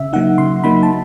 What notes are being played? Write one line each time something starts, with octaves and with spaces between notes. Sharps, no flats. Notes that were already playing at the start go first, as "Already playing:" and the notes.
Already playing: C#3 E5
F#3 A#3 D#4 F#5
C#3 C6
F#3 A#3 D#4 B5
A5